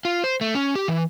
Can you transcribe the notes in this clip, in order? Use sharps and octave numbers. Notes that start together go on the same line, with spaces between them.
F4
C5
A3
C#4
G4
E3